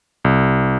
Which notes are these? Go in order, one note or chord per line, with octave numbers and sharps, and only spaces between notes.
C2